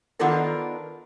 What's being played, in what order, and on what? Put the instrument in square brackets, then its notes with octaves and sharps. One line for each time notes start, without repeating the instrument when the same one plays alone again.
[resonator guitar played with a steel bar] D#3 B3 D4 F4 A4 A#4